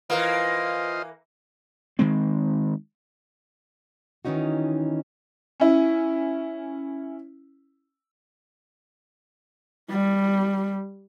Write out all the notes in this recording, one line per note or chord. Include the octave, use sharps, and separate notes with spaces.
E3 A#3 F4 B4 C5 D#5 F5
D#3 G#3 C4
D#3 E3 A3 C#4 D#4 F#4
C#4 E4
G3